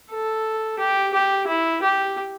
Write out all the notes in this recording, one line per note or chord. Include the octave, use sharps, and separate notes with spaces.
A4
G4
G4
E4
G4